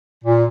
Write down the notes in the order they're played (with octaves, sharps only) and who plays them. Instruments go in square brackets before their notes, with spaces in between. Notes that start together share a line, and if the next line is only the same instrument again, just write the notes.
[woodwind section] A#2